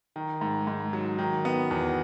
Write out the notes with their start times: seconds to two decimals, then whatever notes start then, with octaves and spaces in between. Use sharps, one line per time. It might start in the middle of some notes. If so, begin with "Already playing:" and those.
0.16 D#3
0.41 G#2
0.67 G#2
0.93 F#3
1.18 D#3
1.45 B3
1.71 E2